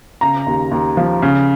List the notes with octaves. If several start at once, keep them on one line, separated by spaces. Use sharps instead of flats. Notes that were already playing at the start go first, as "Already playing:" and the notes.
C#3 A#5
D#2
D#2
F3
C#3